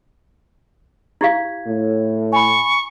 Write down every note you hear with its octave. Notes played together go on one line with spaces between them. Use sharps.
E4 G4 F5 G#6
A2
G#5 B5 C#6